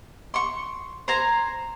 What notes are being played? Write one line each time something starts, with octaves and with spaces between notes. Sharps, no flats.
C6 C#6
C5 G#5 A#5